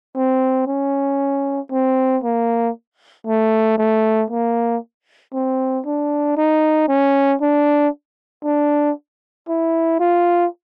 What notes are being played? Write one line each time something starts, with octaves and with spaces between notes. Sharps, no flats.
C4
C#4
C4
A#3
A3
A3
A#3
C4
D4
D#4
C#4
D4
D4
E4
F4